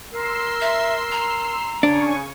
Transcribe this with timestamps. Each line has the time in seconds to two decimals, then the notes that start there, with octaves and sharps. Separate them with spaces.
0.12 A#4 C6 E6 C7
0.61 E5
1.12 A#5
1.83 C#3 D4 G#5 C#6